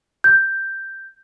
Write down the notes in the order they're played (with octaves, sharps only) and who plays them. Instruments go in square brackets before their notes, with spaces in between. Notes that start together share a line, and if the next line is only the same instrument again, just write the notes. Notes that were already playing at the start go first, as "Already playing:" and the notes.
[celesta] G6